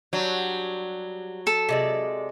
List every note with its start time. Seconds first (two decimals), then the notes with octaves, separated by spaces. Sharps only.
0.13 F#3 G3 D4 F#4
1.47 A4
1.69 C3 G#3 D5